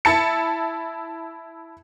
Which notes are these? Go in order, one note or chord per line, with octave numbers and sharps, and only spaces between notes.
E4 A5 C#7